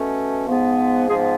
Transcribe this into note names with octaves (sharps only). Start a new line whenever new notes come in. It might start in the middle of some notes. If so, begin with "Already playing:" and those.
Already playing: B2 A3 C#4
G#2 F3 B3
G#2 F3 B3 G#4